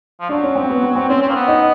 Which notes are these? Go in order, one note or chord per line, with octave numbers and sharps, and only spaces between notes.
F3
F#3 D4
C#4
C4
B3
B3
C4
C4 C#4
C4
A#3
B3
D#4